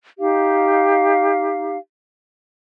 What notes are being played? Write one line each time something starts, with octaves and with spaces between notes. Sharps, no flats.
D#4 G4 F5